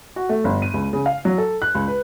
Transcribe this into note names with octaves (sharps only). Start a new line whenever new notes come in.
F#4
A3
G1
D#7
C#2
C#3
F5
F#3
A4
F#6
C#2
B4